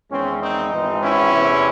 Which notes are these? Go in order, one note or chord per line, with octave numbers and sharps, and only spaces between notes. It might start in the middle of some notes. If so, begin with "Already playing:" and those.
E2 D#3 G#3 C4 C#4
C4 D#4
G#1 G#2 E3 C4
C#4 E4
E2 C3 E3